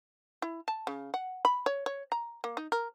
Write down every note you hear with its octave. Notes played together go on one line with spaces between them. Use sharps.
E4
A5
C#3
F#5
B5
C#5
C#5
A#5
A#3
D#4
A#4